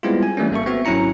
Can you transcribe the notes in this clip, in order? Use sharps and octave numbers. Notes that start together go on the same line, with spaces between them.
G3 G#3 B3 C4 E4 F4
G#5
E3 G3 A3 A#3 C#4
G#1 A#3 A4 E5 C#6
B3 C4 F#4 E5
G#1 F#3 C#4 E4 A#5 C#7